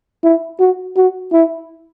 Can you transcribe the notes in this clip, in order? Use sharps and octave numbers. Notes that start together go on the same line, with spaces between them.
E4
F#4
F#4
E4